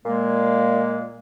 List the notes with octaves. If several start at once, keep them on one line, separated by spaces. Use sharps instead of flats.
A#2 G#3 A#3